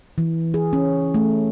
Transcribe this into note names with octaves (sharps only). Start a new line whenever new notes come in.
E3
G#4
C#4
A3